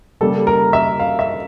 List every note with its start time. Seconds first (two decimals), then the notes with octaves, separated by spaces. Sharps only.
0.21 C#3 G3 A#3 A4
0.47 A#4
0.73 E5
1.00 F5
1.19 E5